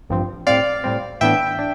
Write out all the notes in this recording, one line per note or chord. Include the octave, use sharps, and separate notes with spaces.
A1 G2 F3 C4
A2 G3 C4 D5 F5
A2 G3 C4
A2 E3 B3 D4 E5 G5
D4